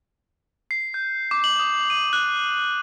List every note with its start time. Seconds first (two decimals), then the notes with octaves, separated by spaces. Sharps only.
0.71 C7
0.94 G6
1.31 D6
1.44 F#7
1.60 D#6
1.90 D#7
2.13 F#6